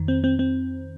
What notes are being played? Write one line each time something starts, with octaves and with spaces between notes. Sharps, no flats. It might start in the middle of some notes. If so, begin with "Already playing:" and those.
Already playing: F2 D#3
C4
C4
C4